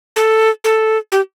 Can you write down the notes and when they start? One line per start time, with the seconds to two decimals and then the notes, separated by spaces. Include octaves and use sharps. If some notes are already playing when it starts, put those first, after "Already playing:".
0.16 A4
0.64 A4
1.12 G4